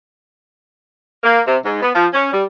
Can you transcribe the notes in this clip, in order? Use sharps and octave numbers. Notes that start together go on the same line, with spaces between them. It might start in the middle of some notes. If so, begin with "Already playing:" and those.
A#3
C3
G#2
B3
F3
C#4
G3